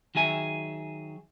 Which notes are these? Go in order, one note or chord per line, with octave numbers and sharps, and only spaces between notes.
D#3 F#3 G#4 E5 G#5